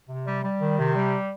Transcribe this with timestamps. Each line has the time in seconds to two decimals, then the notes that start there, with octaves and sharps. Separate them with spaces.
0.09 C3
0.26 G3
0.43 G3
0.61 D#3
0.78 C3
0.95 G3